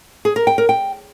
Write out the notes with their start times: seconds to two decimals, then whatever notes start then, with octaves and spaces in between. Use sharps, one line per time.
0.25 G#4
0.36 A#4
0.47 G5
0.58 A#4
0.69 G5